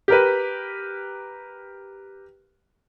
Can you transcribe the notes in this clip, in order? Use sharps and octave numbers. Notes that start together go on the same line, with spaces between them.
G4 A#4 B4